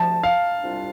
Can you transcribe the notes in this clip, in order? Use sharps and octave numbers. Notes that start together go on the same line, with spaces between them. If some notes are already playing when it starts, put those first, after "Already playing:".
Already playing: D2 C3 F3 A3 A5
F5
C2 C3 G3 D4 F4